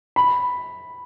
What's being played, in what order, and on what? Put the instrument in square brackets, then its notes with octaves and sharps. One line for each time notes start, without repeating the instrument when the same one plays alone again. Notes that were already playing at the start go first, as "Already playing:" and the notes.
[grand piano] B5